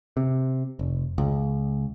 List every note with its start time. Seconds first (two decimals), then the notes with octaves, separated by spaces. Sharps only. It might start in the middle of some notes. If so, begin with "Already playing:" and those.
0.17 C3
0.79 F1
1.18 C#2